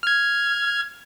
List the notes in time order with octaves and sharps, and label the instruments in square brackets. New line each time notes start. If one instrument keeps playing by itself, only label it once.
[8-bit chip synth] F6 G#6